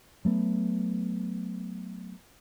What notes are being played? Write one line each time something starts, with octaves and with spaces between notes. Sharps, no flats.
F#3 A3 B3